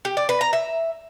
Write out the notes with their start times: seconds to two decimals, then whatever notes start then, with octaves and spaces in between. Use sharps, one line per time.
0.05 G4
0.17 D5
0.29 B4
0.41 A#5
0.53 E5